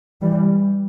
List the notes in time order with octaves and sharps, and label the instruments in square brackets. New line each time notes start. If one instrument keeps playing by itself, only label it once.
[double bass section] E3 G3